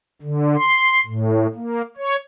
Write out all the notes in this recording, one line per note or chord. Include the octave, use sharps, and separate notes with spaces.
D3
C6
A2
A#3
C#5